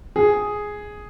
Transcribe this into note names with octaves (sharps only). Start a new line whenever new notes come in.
G#4